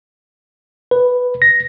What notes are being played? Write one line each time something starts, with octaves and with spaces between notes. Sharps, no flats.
B4
A#6